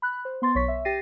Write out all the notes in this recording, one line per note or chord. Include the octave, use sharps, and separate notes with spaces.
B5 F#6
C5
B3 C6 A6
B1 C#5 C#6 B6
E5
G4 G5 A6 A#6 C7 D#7